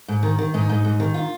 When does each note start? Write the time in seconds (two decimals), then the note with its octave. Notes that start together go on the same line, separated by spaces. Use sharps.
0.08 G#2
0.23 D#3
0.39 D#3
0.54 G#2 D#4
0.69 G#2
0.85 G#2
1.00 D#3
1.14 F4